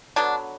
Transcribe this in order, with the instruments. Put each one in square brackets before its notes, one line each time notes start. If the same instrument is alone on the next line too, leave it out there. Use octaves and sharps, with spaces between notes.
[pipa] D3 F#3 B3 D4